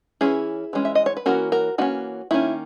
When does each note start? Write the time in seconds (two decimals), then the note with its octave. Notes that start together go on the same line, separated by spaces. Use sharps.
0.21 E3 G#3 C#4 E4 G#4
0.73 E3 G#3 C#4
0.85 E5
0.95 D#5
1.06 C#5
1.17 B4
1.26 E3 A#3 C#4 F#4 A#4
1.52 F#4 A#4
1.78 E3 A#3 C#4 D#4 F#4
2.31 D#3 A#3 C#4 E4